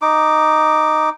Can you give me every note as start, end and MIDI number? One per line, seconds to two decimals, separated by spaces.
0.02 1.10 63
0.02 1.10 86